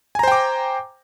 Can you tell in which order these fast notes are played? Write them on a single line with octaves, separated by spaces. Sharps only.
G#5 A#5 C5 G5 D6